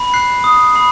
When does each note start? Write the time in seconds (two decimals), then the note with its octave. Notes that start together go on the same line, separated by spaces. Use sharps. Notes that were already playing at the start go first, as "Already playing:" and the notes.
Already playing: B5
0.14 F#6 C7
0.44 D#6
0.75 B5 C7